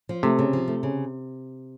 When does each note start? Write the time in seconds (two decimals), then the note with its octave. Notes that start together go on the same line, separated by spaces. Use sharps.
0.09 F3
0.23 C3 A3
0.39 C#3
0.53 F3
0.68 A3
0.83 C#3